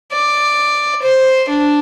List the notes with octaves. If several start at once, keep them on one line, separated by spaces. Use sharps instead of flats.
D5
C5
D4